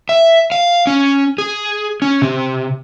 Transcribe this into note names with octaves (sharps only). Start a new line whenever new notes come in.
E5
F5
C#4
G#4
C#4
C3